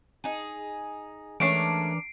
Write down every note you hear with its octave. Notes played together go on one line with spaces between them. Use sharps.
D#4 G#4
E3 G#3 A3 C#4 D4 A#4 C7 D7